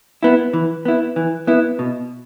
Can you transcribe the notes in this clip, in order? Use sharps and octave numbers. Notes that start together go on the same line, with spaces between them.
B3 E4
E3
B3 E4
E3
B3 E4
B2